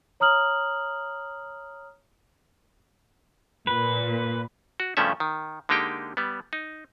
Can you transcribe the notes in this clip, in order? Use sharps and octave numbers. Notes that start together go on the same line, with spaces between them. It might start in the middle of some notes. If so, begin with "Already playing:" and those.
C#5 A#5 D#6 F6 F#7
A#2 B4
F#4
G2 C#3 F3 A3 C#4 E5
D#3
D3 G#3 A#3 D#4 G4 G5
G3 B3
D#4